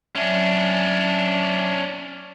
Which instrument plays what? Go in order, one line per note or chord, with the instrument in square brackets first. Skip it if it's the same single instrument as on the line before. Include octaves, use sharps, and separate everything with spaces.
[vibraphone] F#3 D5 E5 [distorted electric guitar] C#4 D4